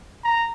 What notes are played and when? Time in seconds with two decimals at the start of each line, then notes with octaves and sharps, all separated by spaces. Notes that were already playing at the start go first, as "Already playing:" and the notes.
0.24 A#5